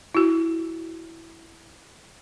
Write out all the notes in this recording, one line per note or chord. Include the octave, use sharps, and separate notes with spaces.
E4 F#4